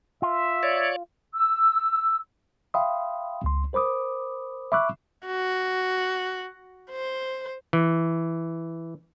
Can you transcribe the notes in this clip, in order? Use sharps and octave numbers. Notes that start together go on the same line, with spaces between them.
F4 E5
C#5 D5
E6
E5 F5 G5 B5 C6 D#6
C#2 C6
A#4 C5 B5 D6 D#6
E5 B5 C#6 D6 E6 F#6
F#4
C5
E3